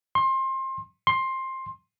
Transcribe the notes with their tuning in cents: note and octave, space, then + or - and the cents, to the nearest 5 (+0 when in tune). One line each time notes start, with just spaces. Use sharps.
C6 +25
C6 +15